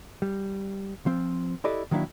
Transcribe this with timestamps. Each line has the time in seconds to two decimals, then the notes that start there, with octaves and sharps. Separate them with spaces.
0.22 G3
1.06 F3 C4
1.64 E4 G4 A4 B4 D5 D#5
1.91 D#3 F#3 A#3 D4 E4